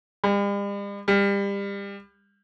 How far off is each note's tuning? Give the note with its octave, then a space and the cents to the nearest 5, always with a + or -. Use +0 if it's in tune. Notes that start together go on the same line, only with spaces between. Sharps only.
G3 +45
G3 +30